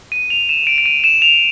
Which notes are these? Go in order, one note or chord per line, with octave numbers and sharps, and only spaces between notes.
D#7
F7
E7
D7
D7
D#7
E7
F7